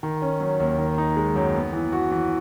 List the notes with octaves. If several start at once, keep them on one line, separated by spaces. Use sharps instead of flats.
D#3
C#4
F#3
D#2
D#3
D#4
G#3
F#2
B3
E3
F#4
E3